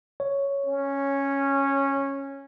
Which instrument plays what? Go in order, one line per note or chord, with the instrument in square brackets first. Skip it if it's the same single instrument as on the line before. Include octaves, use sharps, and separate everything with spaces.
[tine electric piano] C#5
[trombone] C#4